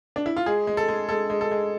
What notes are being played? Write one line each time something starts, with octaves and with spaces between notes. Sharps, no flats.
D4
E4
F4
G#3 G#4
G#3
A4
G#3
G#3 A4
G#3
A4
G#3